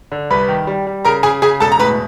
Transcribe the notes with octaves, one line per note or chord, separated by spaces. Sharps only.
D3
C2 B4 B5
D#3
G3
G3
C#3 A#4 A#5
C#3 G#4 G#5
C#3 G#4 G#5
E1 A4 A5
A#5
A2 B4 B5